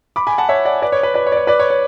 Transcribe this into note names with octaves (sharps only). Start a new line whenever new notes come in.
B5 D6
G#5 B5
F#5 A5
C#5 E5
D5 F#5
B4 D5
C#5
B4
B4 D5
C#5
D5
C#5
B4 D5
C#5
C#5